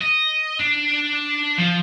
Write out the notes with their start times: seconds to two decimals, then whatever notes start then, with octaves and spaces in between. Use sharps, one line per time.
0.01 D#5
0.59 D4
1.58 F3